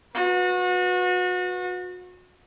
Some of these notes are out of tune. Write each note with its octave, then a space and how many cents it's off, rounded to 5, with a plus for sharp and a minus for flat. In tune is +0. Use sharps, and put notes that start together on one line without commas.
F#4 -35 B4 -5